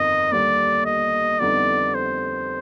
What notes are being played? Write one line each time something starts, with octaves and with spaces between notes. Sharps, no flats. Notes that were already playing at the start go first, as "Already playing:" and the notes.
Already playing: G1 F2 D#3 D#5
D#2 D3 G3 D5
D#5
F2 D3 G3 B3 D#4 D5
C5